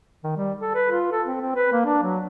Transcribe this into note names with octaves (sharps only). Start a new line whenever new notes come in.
D#3
G3
A4
B4
F4
A4
C4
C4
B4
A#3
D4
F#3